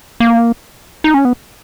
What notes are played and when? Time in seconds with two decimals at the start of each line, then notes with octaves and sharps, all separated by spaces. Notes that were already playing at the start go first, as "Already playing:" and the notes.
0.20 A#3
1.04 D#4
1.14 C#4
1.25 B3